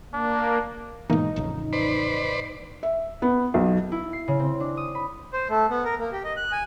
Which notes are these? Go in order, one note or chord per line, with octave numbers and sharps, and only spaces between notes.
A#3 D4
G#2 B2 E3 A#3 D#4
A1 F2 C#3
B4 C5 D5
E5
B3
B1
E4
C7
C#3
C4
D4
D#6
B5
C5
A3
B3
A#4
A#3
G4
D#5
F#6
G#5